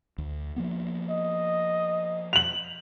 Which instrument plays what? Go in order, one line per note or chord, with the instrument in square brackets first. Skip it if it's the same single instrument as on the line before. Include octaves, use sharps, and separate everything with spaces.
[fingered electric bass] D2
F3 A#3 B3
[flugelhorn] D#5
[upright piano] F7 F#7